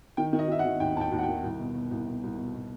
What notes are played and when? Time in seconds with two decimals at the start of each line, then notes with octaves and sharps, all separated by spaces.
0.17 D#3 G5
0.33 D#3
0.39 D#5
0.48 D#3 E5
0.59 F#5
0.65 D#3
0.80 D#2 G5
0.96 D#2 A5
1.01 G5
1.12 D#2
1.19 F#5
1.23 G5
1.28 D#3
1.43 C2
1.59 B2
1.75 B2
1.91 C2
2.07 B2
2.23 C2
2.38 B2
2.54 B2